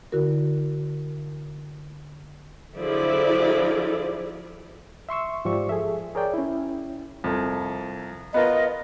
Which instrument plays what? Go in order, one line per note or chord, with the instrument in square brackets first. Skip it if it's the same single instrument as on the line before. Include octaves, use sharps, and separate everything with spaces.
[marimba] D3 E4 F#4 A#4
[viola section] D3 F3 F#3 E4 G#4 D5
[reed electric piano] E5 C6 C#6 E6
G#2 F3 G4 D5 C#6
G#4 A4 E5
G#4 A#4 C#5 D5 G5
C#4 E4
[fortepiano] C2 F2
[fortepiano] B3 F4 A#4 [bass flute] D#5